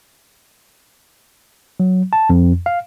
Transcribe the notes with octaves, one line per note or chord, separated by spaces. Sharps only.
F#3
A5
F2
F5